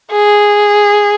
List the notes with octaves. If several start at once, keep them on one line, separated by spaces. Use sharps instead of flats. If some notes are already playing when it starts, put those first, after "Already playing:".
G#4